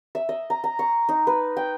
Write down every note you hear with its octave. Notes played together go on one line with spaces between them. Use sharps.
E5
D#5
A#5
A#5
C#6
D#4
B4
G5